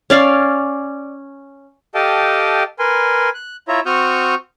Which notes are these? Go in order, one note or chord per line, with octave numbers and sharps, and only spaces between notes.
C#4 D5 F5
G4 A4 D#5 F5 G5 A5
A#4 B4 G#5 C6
F#6
E4 F4 C#5 E5 A#5
C4 F#4 C#6 D#6 F6 G6